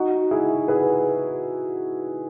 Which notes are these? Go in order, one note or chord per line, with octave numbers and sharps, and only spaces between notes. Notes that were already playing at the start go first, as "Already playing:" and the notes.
Already playing: D#4 F#4
E4 G#4
G#4 B4